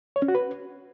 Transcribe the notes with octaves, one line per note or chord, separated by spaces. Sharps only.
C#5
C#4
F#4
B4